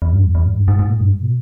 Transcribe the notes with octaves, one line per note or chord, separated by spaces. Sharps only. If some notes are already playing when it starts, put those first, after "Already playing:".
E2
G2
E2
E2
G#2
G2
G#2
G#2
A#2
G2
G#2
B2